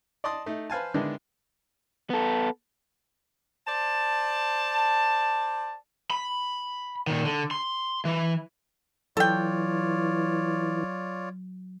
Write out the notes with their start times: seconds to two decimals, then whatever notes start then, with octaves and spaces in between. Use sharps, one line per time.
0.24 D5 D#5 A5 C6 D6 D#6
0.46 A3 D#4
0.70 B4 C5 F5 G#5 A5
0.94 D3 D#3 G#3 B3 D4 E4
2.10 B3 A4
3.67 C5 D5 A5
6.11 B5
7.07 A#2 D#3
7.25 D3
7.51 C6
8.05 E3
9.17 E3 F#3 F4 A4 C#5 D5 G5